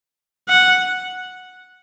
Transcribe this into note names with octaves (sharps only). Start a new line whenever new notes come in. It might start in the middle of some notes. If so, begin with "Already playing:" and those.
F#5